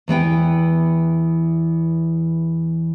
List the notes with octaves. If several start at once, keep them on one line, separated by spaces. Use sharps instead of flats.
E2 E3 B3 G5